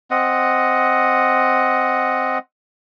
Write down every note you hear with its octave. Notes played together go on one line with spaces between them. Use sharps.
C4 D#5 F#5